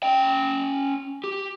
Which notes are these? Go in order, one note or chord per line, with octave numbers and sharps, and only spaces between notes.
C#4 G5
G4